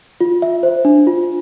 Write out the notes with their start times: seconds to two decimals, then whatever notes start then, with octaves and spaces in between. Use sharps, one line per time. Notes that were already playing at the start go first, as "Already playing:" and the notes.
0.21 F4
0.42 E5
0.63 C5
0.85 D4
1.07 F4